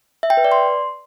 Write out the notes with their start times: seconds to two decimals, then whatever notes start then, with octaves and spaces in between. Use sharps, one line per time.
0.23 E5
0.30 G5
0.37 B4
0.44 D5
0.52 C6